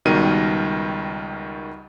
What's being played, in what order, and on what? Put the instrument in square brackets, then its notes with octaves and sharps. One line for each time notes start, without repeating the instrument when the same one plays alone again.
[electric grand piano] C#2 B2 D#3 G3 A#4 D#7